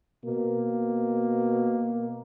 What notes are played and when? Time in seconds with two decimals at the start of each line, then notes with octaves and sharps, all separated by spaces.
0.25 B2 A#3